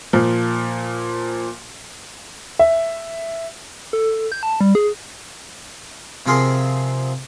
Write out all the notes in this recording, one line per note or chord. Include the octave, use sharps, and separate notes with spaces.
A#2 F3
E5
A4
G6
A5
G3
G#4
C3 F3 C4 G#4 A#4 C6